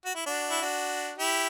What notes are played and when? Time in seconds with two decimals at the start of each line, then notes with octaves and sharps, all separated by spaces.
0.05 F#4
0.15 E4
0.26 D4 F#4
0.50 E4
0.61 D4 F#4
1.18 E4 G4